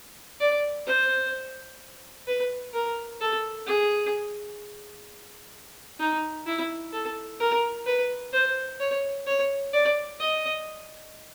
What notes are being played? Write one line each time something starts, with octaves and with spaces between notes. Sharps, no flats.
D5
C5
B4
A#4
A4
G#4
D#4
E4
A4
A#4
B4
C5
C#5
C#5
D5
D#5